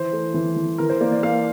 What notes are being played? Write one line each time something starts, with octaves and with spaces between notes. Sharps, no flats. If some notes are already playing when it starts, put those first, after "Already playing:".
Already playing: E3 C5
A3
E3
E3
E3 A#4
C5
A#3 D5
D5
A#3 F5